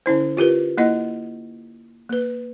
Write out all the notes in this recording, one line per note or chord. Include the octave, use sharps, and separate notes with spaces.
D3 C#4 E4 C5
F4 G4 A#4 B4
A#3 E4 D#5 F#5
A#3 B4